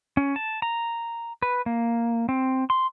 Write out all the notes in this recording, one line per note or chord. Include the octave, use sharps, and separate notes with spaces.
C#4
A5
A#5
B4
A#3
C4
C6